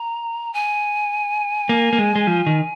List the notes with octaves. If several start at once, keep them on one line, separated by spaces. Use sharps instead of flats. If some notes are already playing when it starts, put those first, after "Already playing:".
Already playing: A#5
G#5
A#3
A#3
G#3
G#3
F3
D#3